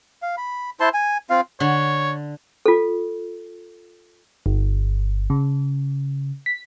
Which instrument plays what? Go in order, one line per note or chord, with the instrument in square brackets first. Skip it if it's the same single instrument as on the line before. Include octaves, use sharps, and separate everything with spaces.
[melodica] F5
B5
E4 C5 A5 C6
G#5
C4 F4 F5
[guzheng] D3 [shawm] C#5
[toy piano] F4 A4
[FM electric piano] G1
C#3
B6